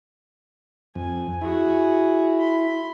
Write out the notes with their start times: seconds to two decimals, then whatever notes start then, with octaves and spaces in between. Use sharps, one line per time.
0.95 F2 G#5
1.41 E4 F#4 G#4
2.39 B5 C6